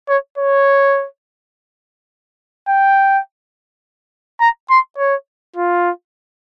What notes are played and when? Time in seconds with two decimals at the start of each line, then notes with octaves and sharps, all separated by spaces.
0.09 C#5
0.38 C#5
2.68 G5
4.40 A#5
4.70 C6
4.98 C#5
5.56 F4